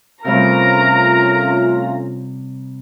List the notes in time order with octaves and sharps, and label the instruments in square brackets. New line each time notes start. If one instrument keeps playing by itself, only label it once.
[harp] C3 G3 [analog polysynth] A3 C#4 F4 [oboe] A#4 [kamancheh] A#5